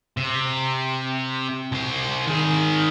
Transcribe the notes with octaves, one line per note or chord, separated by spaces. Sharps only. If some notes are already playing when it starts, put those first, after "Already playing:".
C3
C2 C5
D#3 G#4